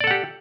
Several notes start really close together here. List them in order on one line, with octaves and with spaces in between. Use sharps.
D5 A4 F#5 G4